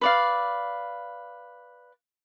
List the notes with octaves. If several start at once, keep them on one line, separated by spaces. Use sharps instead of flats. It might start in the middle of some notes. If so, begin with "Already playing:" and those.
B4 D5 F5